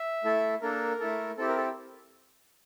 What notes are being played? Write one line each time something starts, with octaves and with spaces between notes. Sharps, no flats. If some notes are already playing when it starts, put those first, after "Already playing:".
Already playing: E5
A3 E4 A4
A#3 D4 A4 A#4
A3 E4 A4
C4 E4 G4 A4
A#4
A4